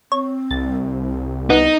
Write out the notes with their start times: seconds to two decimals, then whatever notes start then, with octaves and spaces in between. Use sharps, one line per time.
0.12 C4 C#5
0.51 C2 A6
1.50 B3 D#4